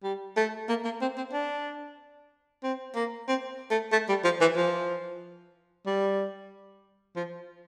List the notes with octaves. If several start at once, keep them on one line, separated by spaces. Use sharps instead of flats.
G3
A3
A#3
A#3
C4
C4
D4
C4
A#3
C4
A3
A3
G3
F3
E3
F3
G3
F3